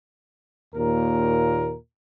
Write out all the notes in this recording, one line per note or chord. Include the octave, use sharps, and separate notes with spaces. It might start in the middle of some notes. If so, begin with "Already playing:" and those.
D#2 A#2 A#4